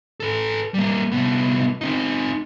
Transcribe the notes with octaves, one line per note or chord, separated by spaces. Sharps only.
A4 B4
G3 A#3
C2 B3
C4 D#4